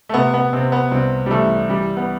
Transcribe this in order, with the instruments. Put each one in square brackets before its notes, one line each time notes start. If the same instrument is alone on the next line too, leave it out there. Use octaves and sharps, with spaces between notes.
[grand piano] A3
C3 B3
B3
C3 C4
B3
C2 C4
G3
E3 A3
E3 G3
B3